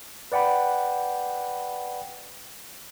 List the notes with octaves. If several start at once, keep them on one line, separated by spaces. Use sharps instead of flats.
B4 D5 F#5 G5 B5